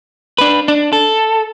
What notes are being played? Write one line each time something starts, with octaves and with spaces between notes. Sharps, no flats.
D4 B4
D4
A4